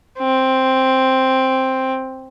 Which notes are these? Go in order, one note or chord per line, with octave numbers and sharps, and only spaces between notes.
C4